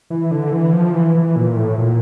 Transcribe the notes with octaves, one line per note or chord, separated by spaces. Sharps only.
E3
D3
E3
F3
E3
E3
A#2
A2
A#2